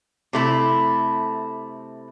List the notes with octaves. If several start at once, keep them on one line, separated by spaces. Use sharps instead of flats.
C3 A3 E4